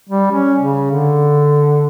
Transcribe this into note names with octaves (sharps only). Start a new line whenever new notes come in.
G3
C#4
C#3
D3